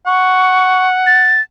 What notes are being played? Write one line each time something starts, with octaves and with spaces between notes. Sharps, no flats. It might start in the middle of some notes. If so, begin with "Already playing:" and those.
F#5 C#6
A6